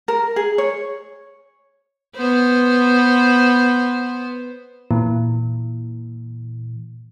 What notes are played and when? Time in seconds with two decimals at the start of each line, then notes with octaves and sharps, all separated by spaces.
0.08 A#4
0.36 G#4
0.58 C#5
2.16 B3 C5
4.91 A#2 E3